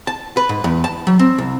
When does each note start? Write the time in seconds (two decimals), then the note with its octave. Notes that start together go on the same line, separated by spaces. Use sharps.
0.07 A5
0.37 B4
0.49 G#2
0.64 E2
0.84 A5
1.07 F#3
1.19 C4
1.38 C2